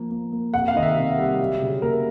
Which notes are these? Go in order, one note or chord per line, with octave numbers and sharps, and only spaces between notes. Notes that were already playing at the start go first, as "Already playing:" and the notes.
Already playing: F3 A#3
A#3
A#3
C3 F#5
F5
D#3 D#5
E5
C3
G3
F#3
C#3
A#3 A#4